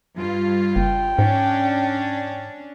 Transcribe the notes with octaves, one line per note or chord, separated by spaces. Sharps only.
G2 F4
F#1 G5
G#2 C#4 D4